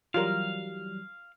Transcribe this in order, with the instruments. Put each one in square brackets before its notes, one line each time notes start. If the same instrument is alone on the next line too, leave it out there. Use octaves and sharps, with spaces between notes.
[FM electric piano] E3 F#3 G3 [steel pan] F4 A#4 [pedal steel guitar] F5